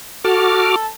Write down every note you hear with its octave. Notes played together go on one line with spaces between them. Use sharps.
F#4 A4 D6 F6